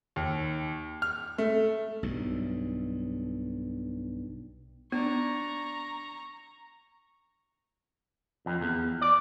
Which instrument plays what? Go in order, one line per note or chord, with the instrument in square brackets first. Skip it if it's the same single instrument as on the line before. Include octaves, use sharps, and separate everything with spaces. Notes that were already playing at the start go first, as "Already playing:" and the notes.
[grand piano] D#2
F6
A3
[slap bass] B1 G2
[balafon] B3 [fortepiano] D4 [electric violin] A#5 C#6
[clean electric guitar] F2
E2
D5